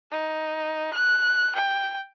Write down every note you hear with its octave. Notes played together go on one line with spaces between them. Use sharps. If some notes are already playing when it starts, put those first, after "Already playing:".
D#4
F#6
G5